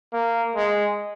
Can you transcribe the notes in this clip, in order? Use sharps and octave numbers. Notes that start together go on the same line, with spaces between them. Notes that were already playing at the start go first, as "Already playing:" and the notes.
A#3
G#3